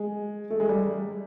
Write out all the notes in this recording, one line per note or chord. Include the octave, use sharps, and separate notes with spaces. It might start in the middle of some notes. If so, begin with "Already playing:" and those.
Already playing: G#3
A3
G#3
G3